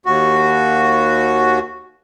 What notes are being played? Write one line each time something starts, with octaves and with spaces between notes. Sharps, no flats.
D#2 F#4